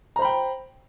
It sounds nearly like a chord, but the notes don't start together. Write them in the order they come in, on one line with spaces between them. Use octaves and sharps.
A#5 C5 B5 G5